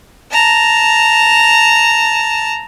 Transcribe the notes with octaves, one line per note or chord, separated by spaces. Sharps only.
A5 A#5